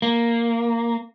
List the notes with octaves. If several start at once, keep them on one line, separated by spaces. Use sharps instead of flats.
A#3